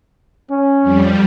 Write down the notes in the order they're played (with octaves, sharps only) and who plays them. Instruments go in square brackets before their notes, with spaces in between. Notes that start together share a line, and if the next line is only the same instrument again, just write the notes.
[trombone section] C#4
[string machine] F2 G3